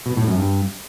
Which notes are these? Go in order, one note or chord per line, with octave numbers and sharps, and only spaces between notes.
B2
A2
F#2
G2